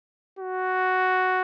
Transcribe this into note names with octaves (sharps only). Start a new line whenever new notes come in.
F#4